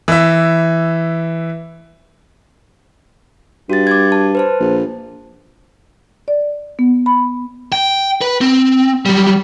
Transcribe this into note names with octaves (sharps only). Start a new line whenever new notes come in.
E3 E5
G2 F#4 A6
D6 G#6
A5
B4 C5 A5
A#1
D5
B3
B5
G5
B4
C4
F#3 G3